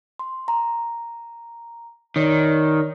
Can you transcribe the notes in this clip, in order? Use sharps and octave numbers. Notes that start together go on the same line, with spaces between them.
C6
A#5
D#3 C#5 D5